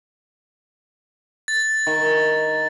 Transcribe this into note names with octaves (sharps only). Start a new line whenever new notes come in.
A6
D#3 C#6